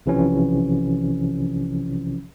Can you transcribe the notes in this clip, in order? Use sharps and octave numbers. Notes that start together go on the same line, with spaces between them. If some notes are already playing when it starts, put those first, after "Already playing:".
B1 C3 E3 F3 C#4